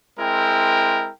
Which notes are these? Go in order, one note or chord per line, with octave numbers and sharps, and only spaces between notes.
G#3 C4 E4 A#4 G5